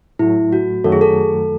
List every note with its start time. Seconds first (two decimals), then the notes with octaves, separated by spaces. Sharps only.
0.19 A2 F#3 A3 E4
0.53 F#4
0.84 F#2 D#3 F#3 A3 A4
0.92 G#4
1.01 A4